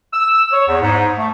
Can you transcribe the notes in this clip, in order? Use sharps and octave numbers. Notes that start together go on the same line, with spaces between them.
E6
C#5
E2
G#2
A3